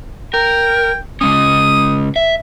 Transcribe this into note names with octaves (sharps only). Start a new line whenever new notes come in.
A#4 G5
C#3 G#3 C#4 D#6
E5